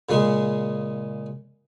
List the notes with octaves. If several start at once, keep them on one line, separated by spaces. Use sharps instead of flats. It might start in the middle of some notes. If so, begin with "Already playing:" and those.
A#2 C#3 G#3 G#4